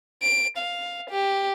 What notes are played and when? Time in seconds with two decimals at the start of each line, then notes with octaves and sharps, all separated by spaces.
0.23 D7
0.57 F5
1.10 G4